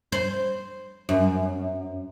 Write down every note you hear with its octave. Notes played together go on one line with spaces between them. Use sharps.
C5
F#2